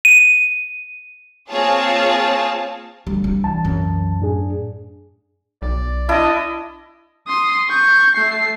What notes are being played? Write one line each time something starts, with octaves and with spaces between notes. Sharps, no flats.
D#7
A#3 C4 F4 G#4 C#5 A5
D2 G3
D4
C2 E3 A5
F#2
A2 D4 G#4
B1 D5
D4 E4 D#5 A5
C6 D#6
C#6 G6
A3 C7